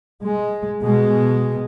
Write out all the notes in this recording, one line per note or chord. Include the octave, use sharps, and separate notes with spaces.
G#3
B2 G#3